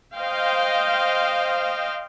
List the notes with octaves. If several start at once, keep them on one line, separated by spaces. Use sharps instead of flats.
C5 D#5 F5 G5